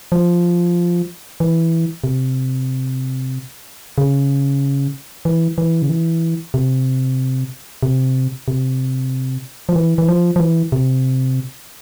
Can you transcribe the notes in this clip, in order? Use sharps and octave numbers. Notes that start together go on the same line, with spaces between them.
F3
E3
C3
C#3
E3
E3
C#3
E3
C3
C3
C3
F3
E3
E3
F3
F3
E3
C3